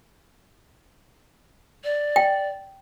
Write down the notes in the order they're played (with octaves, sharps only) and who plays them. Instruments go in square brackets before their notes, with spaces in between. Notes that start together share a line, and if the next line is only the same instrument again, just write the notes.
[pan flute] D5
[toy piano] G5